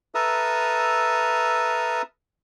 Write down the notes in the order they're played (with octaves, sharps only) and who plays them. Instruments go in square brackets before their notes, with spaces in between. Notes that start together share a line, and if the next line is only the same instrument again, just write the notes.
[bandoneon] A4 B4 E5 A#5 D#6 F6